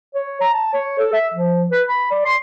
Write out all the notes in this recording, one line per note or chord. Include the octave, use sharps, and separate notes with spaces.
C#5
A#5
A5
C#5
A4
E5
F3
B4
B5
D5
C6